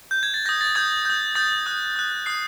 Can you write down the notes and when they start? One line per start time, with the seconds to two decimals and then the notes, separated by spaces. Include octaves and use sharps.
0.11 G6
0.23 G#6
0.34 A6
0.46 D#6 G6 A#6
0.61 A6
0.75 D#6 G6 G#6
1.05 D#6 G6
1.35 D#6 G6 A6
1.66 D#6 F#6
1.96 D#6 F#6
2.26 D#6 F#6 C7